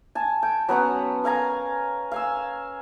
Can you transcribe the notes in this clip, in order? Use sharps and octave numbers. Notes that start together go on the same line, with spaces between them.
G#5 A5
G5
F#3 B3 C#4 F#5
A#4 F5 G#5 A#5
F5 G#5 E6